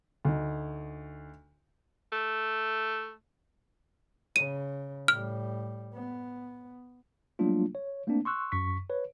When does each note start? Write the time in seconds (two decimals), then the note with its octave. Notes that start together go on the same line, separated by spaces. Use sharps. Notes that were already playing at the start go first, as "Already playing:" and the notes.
0.25 D2 D#4
2.13 A3
4.36 C#3 D#7
5.08 A2 G3 F6
5.94 B3
7.39 F#3 G3 A3 A#3 D4 F4
7.75 C#5
8.07 A3 A#3 C4 D4
8.25 C6 C#6 E6 F#6
8.52 F#2 C#6 B6
8.90 B4 C#5